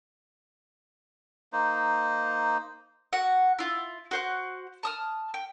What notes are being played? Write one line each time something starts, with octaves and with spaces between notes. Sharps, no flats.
A#3 D#4 C5
F#4 F#5
E4 F4
F#4 C5 F#5
A5 D#6 F6
G5